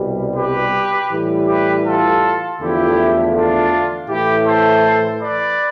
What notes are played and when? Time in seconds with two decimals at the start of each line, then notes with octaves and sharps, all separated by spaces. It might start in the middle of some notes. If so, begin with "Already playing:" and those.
Already playing: C2 B2 G3
0.36 G4 B4
1.10 A2 E3 G3
1.48 G4 B4
1.85 F4 A4
2.60 E2 D3 F3 A3 E4 G4
3.34 D4 F4
4.09 A2 E3 A3 E4 G4
4.46 A4 C5
5.20 B4 D5